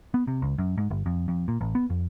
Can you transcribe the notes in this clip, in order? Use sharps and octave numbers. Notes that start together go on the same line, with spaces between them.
B3
C3
C#2
F#2
G#2
G1
F2
F2
A#2
A1
B3
F2